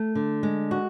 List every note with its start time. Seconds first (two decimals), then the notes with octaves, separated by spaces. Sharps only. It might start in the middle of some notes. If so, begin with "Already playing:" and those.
Already playing: A3
0.15 D3
0.43 G#3
0.71 F#4